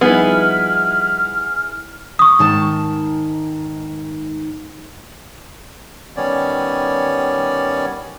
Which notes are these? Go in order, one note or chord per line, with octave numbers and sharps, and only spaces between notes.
F3 G3 B3 D#4 E4 G#4 F6
C#6 D#6
G#2 D#3 A5
D#3 G3 B3 C#4 C#5 D5